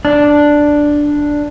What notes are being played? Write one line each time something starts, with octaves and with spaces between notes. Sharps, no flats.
D4